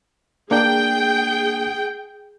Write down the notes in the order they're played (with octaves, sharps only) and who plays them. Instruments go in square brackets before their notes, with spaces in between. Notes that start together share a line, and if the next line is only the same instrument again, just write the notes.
[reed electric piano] A#3 D4 G6 [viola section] G#4 G5